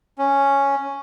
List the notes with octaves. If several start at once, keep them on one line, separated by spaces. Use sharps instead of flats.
C#4